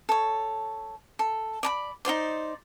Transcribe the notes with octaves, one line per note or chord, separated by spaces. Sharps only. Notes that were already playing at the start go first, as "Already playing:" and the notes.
A4 C#5
A4
D5 A#5 B5
D#4 F4 C5 D5